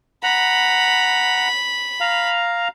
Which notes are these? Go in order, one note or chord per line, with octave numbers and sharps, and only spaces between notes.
F#5 A#5 B5
F5 A#5